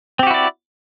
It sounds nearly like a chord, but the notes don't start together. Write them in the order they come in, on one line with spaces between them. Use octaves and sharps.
C4 G4 F#4 E4 D5